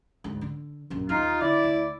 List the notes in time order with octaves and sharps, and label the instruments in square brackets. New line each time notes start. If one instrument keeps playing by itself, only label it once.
[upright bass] D2 G#2
D3
A#1 F#2
[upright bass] D#2 [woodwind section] D#4 F4
[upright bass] D3 [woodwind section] E4 D5
[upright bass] D2